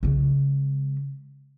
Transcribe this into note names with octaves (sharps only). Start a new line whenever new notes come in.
C#3 G#3